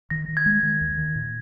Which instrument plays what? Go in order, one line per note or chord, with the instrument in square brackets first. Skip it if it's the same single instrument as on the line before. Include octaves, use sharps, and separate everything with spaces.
[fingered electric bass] D#3 [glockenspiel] A#6
[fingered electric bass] D#3
[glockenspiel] G#6
[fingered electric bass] G#3
D#3
D#2
D#3
A#2